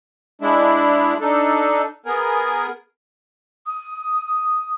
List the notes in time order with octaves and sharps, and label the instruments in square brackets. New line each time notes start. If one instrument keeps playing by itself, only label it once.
[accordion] G#3 D4 E4
D4 D#4 A4
B3 G#4 A#4
[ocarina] D#6